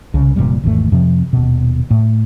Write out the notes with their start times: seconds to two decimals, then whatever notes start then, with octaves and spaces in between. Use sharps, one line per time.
0.14 C2 C#3
0.36 F1 C#2 A#2 G3
0.64 G#1 E2 D#3 A3
0.92 F2 C3 F3
1.33 D#1 B2
1.91 A2